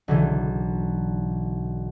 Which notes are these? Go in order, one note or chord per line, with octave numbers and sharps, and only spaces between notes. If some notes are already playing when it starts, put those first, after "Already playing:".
B1 D3 E3